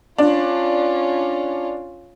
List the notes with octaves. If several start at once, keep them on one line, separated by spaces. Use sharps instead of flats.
C#4 D4 F4